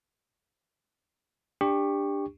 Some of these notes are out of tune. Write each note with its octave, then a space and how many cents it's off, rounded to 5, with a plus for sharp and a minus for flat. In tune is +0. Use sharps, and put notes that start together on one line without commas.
D4 +0 G4 +20 C#6 +0